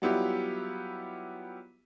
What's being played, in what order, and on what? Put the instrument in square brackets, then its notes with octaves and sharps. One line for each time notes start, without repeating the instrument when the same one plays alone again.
[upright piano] F#3 G3 B3 E4 F4 G4